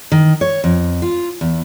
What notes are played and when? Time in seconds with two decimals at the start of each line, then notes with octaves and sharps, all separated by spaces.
0.12 D#3
0.41 C#5
0.64 F2
1.02 F4
1.41 E2